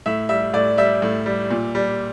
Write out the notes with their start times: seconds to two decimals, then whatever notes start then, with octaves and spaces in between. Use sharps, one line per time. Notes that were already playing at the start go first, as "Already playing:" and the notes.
0.06 A2 E5
0.29 G3 E5
0.54 A2 D5
0.77 G3 E5
1.02 A2
1.26 G3
1.50 A#2
1.75 G3